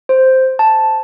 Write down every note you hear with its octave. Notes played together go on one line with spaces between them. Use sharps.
C5
A5